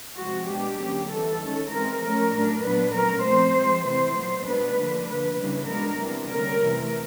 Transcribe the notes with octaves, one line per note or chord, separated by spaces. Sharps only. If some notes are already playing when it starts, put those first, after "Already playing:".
C3 F3 G#3 C4 F#4
B2 G#3 B3 D4 G4
D3 F#3 A#3 C#4
E3 G3 B3 A4
D#3 G#3 C#4
E3 G#3 C4 A#4
F3 A3 C#4 A#4
A2 F#3 A3 D4
A#2 F#3 B3 D4 B4
A#2 F#3 A3 C#4 A#4
F3 A3 C4 C5
F3 G#3 C4
C3 E3 A3 C4 C5
A#2 F#3 B3
B2 G#3 B3 D4 B4
D3 F3 A#3 D4
D3 F3 A#3 B4
C#3 E3 G3 A#3 D4
B2 G#3 B3 D4 A#4
C3 E3 G3 B3 D4
D3 G3 A#3 C#4 A#4
C3 E3 A3